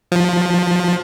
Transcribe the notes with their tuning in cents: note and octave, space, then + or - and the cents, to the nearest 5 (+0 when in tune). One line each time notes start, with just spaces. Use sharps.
F3 +20